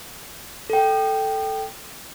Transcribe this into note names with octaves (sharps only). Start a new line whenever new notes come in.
A4 G5